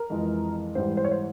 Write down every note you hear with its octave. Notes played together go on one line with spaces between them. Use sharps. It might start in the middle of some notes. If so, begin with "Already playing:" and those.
Already playing: A#4
F2 E3 G#3
G#2 E3 G3 C5
C5
C#5
C5